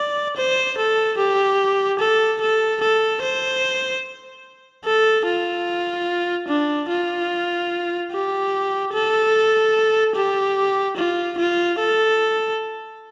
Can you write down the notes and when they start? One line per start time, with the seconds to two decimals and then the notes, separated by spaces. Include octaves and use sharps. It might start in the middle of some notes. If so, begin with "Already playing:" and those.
Already playing: D5
0.36 C5
0.78 A4
1.18 G4
1.99 A4
2.41 A4
2.81 A4
3.22 C5
4.85 A4
5.26 F4
6.48 D4
6.89 F4
8.12 G4
8.93 A4
10.15 G4
10.97 F4
11.38 F4
11.79 A4